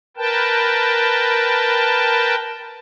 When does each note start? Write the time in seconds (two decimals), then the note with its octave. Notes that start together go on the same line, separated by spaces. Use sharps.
0.17 A#4 B4 G5 A5